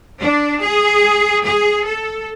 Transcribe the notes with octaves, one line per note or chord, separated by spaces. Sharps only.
D4
G#4
G#4
A4